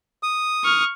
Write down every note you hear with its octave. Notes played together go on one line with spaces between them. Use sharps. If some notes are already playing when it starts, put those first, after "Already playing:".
D#6
C#6 F6